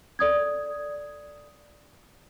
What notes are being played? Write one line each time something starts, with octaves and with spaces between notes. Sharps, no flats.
A4 D5 D#6 G#6